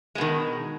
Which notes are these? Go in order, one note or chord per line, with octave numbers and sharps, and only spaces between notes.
B2 D#3 G#3